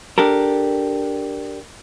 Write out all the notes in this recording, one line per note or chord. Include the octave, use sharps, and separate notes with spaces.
D4 G4 A4 A#4